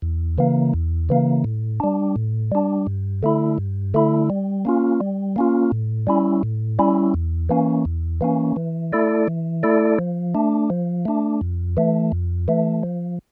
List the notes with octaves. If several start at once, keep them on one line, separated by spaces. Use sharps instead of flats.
E2
C#3 E3 A#3
E2
C#3 E3 A#3
A2
G3 D4
A2
G3 D4
G2
D3 A3 E4
G2
D3 A3 E4
G3
A#3 C#4 F4
G3
A#3 C#4 F4
A2
G3 C#4 E4
A2
G3 C#4 E4
E2
E3 A#3 C#4
E2
E3 A#3 C#4
E3
A3 E4 A4 D5
E3
A3 E4 A4 D5
F3
A3 D4
F3
A3 D4
F2
E3 A3
F2
E3 A3
F3